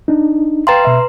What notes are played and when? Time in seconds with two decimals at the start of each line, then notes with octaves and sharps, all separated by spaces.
0.08 D4 D#4
0.67 B4 F5 G5 A#5 C6 A6
0.85 B2 E5